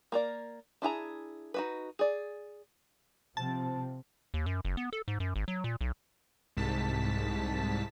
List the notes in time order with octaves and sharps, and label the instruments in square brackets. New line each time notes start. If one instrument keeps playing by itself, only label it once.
[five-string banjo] A#3 A#4 D5
D4 E4 G#4 A#5
D#4 F#4 B4
G#4 D5
[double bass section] C3 F3 C4 [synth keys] A5
[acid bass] D#2
F#2
F#1
B3
A4
G#2
F#2
G#1
F#3
A#2
B1
[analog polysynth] C2 G#2 A5 B6